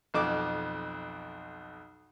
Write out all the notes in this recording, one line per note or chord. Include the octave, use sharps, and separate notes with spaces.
B1 F2 D6